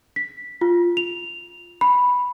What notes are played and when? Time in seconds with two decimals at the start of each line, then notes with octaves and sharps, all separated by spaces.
0.16 B6
0.61 F4
0.97 F7
1.81 B5